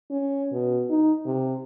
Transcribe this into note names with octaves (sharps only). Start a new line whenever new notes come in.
C#4
B2
D#4
C3